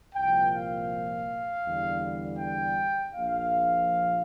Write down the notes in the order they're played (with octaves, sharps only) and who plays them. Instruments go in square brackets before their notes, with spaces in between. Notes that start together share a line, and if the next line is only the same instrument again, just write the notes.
[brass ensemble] C2 A#2 F3 G5
F5
E2 D3 G3
G5
A#1 A#2 F3 F5